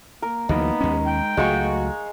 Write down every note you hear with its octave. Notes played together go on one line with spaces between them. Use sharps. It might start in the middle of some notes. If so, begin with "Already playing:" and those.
A#3 A#4
D2 E3 F#3 A#3 B3 D#4
D#2 G#3 C#4
G5
C#2 F#3 G#3 A3 F#4 F5 C#6